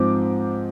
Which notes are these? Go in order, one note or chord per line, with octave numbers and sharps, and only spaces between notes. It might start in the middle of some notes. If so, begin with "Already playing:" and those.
Already playing: G#2 F3 C4 D6